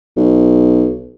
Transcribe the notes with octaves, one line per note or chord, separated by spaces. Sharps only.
B1